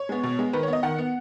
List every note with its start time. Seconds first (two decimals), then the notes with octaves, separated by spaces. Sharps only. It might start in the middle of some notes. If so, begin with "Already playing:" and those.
Already playing: C#5
0.09 G#3 B3
0.23 B2
0.39 G#3 B3
0.53 D#3 B4
0.63 C#5
0.68 B3 D#5
0.83 D#3 F#5
0.98 B3